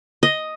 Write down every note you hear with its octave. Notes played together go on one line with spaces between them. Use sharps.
D#5